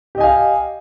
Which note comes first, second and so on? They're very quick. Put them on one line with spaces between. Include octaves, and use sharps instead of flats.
G4 D#5 G#5 F5